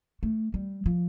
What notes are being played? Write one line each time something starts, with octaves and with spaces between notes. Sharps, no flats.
A3
G3
F3